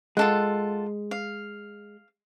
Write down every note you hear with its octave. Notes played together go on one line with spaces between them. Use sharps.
G#3 F4 A4 F#5
F5